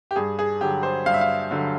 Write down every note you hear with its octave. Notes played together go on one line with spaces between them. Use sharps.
G4
G2 G#4
G#4
D3 F#3 G4
C5
G2 F5
E5
F5
D3 F#3